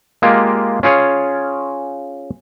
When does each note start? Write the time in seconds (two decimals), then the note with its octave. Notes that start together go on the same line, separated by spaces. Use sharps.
0.22 G#3 A#3 F4 G4
0.83 C#4 F4 G#4 C#5